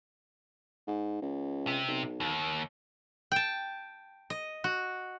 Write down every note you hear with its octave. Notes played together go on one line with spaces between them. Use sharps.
G#2
C#2
C3
B1
D#2
G5 A5
D#5
F#4